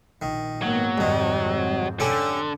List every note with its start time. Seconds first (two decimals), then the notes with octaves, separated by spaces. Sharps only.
0.22 A#1 D#3
0.62 G#2 F#3 A#3 B3
0.98 C2 F2 G#2 D#3 C4
2.00 D3 C#4 G4 A4